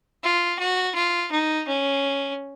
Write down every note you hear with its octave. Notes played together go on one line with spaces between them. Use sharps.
F4
F#4
F4
D#4
C#4